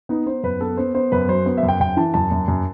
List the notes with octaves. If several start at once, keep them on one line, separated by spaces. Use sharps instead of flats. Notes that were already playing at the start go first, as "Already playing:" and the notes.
B3 D#4
B3 C5
F#2 B4
B3 A4
B3 C5
B3 C5
F#2 B4
F#3 C5
B3
E5
F#2
G5
F#2 G5
E3 A5
F#2 A5
F#2
F#2